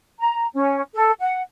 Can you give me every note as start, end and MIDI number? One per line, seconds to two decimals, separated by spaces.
0.19 0.46 82
0.54 0.80 61
0.94 1.11 69
1.20 1.42 78